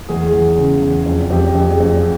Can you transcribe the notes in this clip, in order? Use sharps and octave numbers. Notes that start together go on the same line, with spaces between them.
E2 G#4
E2
C#3
E2
F2
F2 G4
F2 G#4
F2